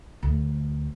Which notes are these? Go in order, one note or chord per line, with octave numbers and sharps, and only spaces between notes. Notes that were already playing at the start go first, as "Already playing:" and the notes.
D2